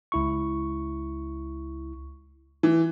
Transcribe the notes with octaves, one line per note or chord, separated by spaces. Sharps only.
C#2 E4 C#6
E3